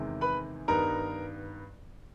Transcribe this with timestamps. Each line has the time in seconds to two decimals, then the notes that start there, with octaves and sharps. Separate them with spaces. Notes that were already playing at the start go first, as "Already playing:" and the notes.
Already playing: E2 C3 D#3 G#3
0.21 B4 B5
0.68 G2 D#3 G3 B3 D#4 A#4 A#5